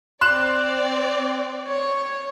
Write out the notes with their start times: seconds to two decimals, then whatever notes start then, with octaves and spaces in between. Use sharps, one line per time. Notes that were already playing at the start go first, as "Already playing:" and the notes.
0.21 C4 D5 C6 F#6 E7
1.67 C#5